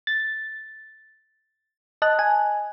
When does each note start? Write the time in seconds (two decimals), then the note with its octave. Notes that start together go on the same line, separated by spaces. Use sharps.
0.07 A6
2.02 D#5 A5 F#6
2.19 G#5